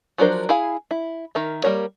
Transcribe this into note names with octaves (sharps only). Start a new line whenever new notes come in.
F3 F#3 D4 A#4 C5
E4 G#4 F5 G#5
E4
D#3 A#4 E5
G3 A#3 A#4 C#5